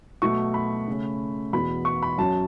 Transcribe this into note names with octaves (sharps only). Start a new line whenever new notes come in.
B2 F#3 A3 C#6
B5
C#3 A3 C#4
E2 B2 B3 B5
C#6
B5
F#2 F#3 C#4 A5